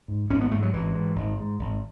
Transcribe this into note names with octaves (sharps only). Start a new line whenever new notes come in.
G#2
G#1 C#4
B3
G#2 A3
F#3
G#1 E3
G#2
G#1
G#2
G#1